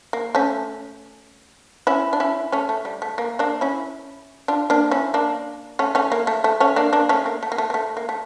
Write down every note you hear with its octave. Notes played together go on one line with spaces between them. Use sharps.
A#3
A3 C#4
C#4 E4
D4
C#4 E4
A3 C#4
A3
G3
A3
A#3
A#3 D4
C#4 E4
D4 F4
A#3 D4
C#4 E4
A#3 D4
A3 C#4
A3 C#4
A#3
A3
A3
A3 C#4
A#3 D4
A#3 D4
A3 C#4
A#3
A3
A#3
A3
A#3
A3
A#3
A3